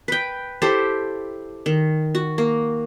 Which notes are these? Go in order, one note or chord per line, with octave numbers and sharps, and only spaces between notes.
B4 G5
E4 G4 A4 C5
D#3
F#4
A#3